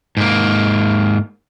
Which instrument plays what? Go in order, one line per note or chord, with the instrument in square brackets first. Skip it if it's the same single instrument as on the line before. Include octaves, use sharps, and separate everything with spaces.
[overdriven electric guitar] G#2 A#3